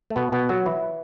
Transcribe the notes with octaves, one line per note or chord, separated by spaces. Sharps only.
A3
B2 B3
B2 B3
F#3 F#4
E3 E4